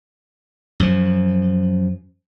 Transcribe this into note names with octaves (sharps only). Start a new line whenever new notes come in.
F#2 F3